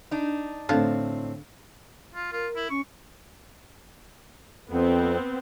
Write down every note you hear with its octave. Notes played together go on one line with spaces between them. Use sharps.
D4 D#4
A2 D3 C4 F4 A5
F4
F4 A#4
E4
C#4 C#6
F2 B3 C4